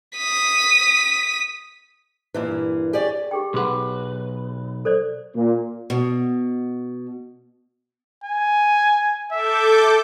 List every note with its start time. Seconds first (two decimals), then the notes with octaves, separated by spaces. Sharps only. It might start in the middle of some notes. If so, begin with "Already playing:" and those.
0.17 D#6 B6
2.34 G2 A#2 E3
2.93 G4 G#4 C#5 D5
3.31 G4 G#4 G5
3.54 B1 F#4 G#4 B4 F#5
4.85 A4 C5 D5
5.35 A#2
5.90 B2
8.24 G#5
9.32 A4 E5 D6 G6